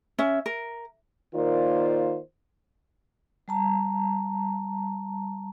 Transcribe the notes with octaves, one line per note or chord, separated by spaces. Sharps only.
C#4 E5
A#4
D#3 A#3 F4 A#4 C5 D5
G3 A5 A#5